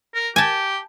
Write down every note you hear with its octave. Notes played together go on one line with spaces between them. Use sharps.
A#4
G4 G#5 A5